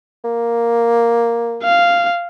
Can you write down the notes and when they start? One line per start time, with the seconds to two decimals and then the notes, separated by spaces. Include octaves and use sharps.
0.24 A#3
1.64 F5